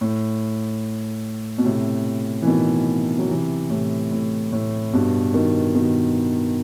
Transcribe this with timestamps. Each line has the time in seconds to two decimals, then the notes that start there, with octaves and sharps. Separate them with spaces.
0.01 A2
1.58 B2
1.64 A2 C3
2.42 E3
2.47 B2 D#3
3.19 F#3
3.29 C3 E3
3.70 A2 C3
4.11 A2
4.52 A2
4.93 G2 B2
5.34 B2 D#3
5.75 B2 D#3